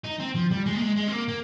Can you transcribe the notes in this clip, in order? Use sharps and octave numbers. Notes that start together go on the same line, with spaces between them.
D#4
C4
F3
G3
G#3
A#3
G#3
G#3
C4
A#3
A#3